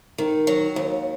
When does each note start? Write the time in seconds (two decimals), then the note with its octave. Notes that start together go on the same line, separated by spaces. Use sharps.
0.18 D#3
0.47 F#3
0.76 D#2